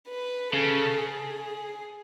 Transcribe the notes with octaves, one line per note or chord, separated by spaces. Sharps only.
B4
C#3 A4
G#4